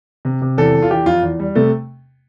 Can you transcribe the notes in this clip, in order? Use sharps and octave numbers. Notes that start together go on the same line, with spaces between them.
C3
C3
E2 A4
E2
F4
E3 G4
F2 F4
E2
G3
C3 A3